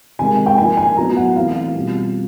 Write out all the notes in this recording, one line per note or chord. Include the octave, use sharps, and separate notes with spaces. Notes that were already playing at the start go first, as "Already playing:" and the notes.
C3 D#3 G#3 G#5
G5
F3 A#3 D#4 G#5
G#5
A2 F#3 B3 D#4 A#5
F#5
E3 A3 C4 E4 F5
B2 G3 C4 F4